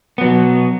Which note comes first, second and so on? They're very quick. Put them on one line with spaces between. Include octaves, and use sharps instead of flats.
B3 F#3 B2